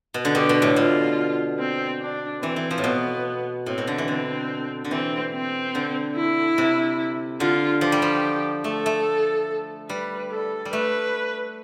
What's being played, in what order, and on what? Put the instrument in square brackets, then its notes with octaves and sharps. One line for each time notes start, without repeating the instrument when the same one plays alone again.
[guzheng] B2
D3
[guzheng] B2 [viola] G4
[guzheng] B2
A2
[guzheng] B2 [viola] F4
[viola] C4
D4
[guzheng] E3 [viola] C4
[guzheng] E3
F3
A2
[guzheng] B2 [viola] B3
[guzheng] A2 [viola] C4
[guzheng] B2
D3
E3
[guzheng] D3 [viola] C4
[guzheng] D3
[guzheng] E3 [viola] C4
[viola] C4
[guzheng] D3
[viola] E4
[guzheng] C3
[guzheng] D3 [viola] F4
[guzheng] F3 [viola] G4
[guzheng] G3
F3
[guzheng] A3 [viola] A4
[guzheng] A3
[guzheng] G3 [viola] B4
[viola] A4
[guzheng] G3
[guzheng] A3 [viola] B4